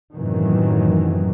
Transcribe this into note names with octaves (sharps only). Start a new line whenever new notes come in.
F#2 A2 C3 D#3 E3 F#3